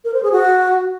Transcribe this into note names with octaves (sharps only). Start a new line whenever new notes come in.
A#4
C5
G#4
F#4